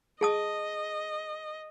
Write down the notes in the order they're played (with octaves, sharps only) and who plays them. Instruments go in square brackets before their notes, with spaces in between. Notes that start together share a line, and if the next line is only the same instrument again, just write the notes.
[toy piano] G#4 A5 D#6 [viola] D#5